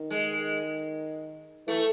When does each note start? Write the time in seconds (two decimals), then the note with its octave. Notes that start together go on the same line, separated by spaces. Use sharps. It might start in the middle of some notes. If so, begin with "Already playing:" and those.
Already playing: D#3
0.10 G#3
1.67 E3 A3